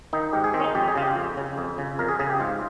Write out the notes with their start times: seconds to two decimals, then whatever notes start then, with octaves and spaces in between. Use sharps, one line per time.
0.13 D#3 D#4
0.33 G#2 G4
0.44 G#4
0.53 D#3 C4
0.60 C#4
0.64 D#4
0.75 F2 G4
0.88 G#4
0.95 C#3 F4
1.03 G4
1.15 F2
1.37 C#3
1.58 F2
1.78 C#3
1.99 F2 A#4
2.09 G#4
2.19 C#3 G#4
2.30 G4
2.40 G#2 F4